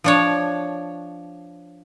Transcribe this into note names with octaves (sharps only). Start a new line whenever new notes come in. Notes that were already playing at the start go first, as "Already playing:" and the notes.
F3 D4 C#5